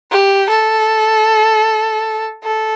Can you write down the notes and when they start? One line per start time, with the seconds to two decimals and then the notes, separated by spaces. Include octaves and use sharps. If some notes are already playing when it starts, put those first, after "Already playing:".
0.11 G4
0.50 A4
2.43 A4